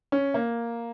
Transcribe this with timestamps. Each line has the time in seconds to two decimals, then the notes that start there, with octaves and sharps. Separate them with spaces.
0.12 C#4
0.34 A#3